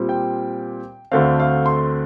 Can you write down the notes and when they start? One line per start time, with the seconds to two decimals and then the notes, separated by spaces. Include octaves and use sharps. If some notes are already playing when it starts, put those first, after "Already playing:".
Already playing: A#2 G3 C4
0.09 G5
1.12 D2 D3 A3 C4 F5
1.40 F5
1.66 C6